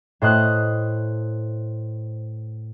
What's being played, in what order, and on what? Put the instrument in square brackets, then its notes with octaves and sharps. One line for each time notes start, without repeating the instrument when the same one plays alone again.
[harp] A2 C5 D#5 F#6